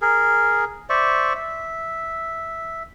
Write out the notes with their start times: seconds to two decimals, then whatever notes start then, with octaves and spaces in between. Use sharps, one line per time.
0.02 G#4 A#4
0.89 C5 D5 E5 C#6
1.35 E5